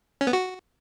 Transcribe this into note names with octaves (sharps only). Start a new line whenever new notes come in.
C#4
B3
F#4